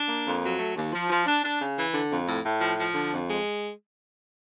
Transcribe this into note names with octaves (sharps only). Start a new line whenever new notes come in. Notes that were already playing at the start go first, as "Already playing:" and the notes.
Already playing: D4
A#3
F2
F#3
A3
D#2
F3
F3
D4
D4
C#3
E3
D3
F2
A2
A2
F3
F3
D3
F2
G#3